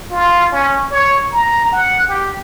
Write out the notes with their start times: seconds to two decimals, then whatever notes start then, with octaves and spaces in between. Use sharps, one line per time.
0.11 F4
0.52 C#4
0.91 C#5
1.32 A#5
1.72 F#5
2.08 G4